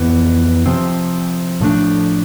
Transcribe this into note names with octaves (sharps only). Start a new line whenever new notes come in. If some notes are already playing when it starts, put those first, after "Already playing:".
Already playing: F2 E3 B3
C3 F3 C4
A2 F3 A3 D4